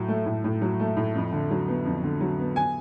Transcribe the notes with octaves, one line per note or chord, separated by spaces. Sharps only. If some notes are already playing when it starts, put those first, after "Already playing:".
Already playing: A2 F#3
A3
A2
A2
F#3
A3
A2
F2
D3
F#3
B3
F2
D3
F#3
B3
G#5